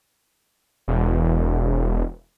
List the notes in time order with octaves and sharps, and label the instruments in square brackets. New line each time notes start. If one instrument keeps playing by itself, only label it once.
[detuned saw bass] E1